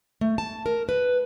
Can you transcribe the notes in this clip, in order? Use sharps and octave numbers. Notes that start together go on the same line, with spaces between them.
A3
A5
A#4
B4